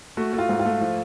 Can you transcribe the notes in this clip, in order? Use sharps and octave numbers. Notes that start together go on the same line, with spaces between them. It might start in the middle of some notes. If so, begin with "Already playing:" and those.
A3 F#4
A3
F4
G#2
F4
A3
F3